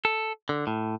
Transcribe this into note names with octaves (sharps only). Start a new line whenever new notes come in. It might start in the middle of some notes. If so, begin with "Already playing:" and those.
A4
D3
A2